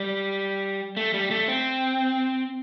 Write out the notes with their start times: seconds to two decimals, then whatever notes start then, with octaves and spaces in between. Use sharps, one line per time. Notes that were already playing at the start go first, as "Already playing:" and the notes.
Already playing: G3
0.97 A3
1.14 G3
1.31 A3
1.48 C4